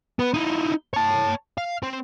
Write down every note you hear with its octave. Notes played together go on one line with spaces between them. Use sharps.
B3
D#4 E4
C#5 A5
F5
C4